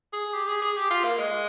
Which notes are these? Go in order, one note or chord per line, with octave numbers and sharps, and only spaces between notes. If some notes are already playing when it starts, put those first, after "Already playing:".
G#4
G4
G#4
G#4
G4
F4
A#3
G#3